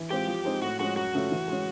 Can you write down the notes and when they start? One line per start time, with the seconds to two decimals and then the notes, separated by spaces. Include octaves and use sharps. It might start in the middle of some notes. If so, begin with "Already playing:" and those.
Already playing: E3
0.10 G#3 C4 F4 G4
0.27 F3
0.45 G#3 C4 D#4
0.62 A2 F#4
0.79 F3 G#3 C#4 F#4
0.96 F#2 F#4
1.14 C#3 F3 A3 C#4
1.31 E3
1.48 G#3 C#4